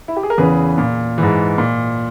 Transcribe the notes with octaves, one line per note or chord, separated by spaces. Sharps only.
E4
G4
G#4
A#4
E2 C#3 E3 G#4 B4
A#2
G#2 E3
A#2